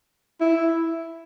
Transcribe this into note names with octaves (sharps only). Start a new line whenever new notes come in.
E4